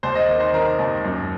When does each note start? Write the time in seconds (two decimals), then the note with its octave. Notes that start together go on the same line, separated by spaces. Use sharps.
0.03 D#2 C5
0.15 D#5
0.28 D#3
0.40 C5
0.53 D#3 A#4
0.79 D#2
1.04 F#2